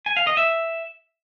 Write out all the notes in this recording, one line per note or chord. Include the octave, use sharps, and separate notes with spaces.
G#5
F5
D#5
E5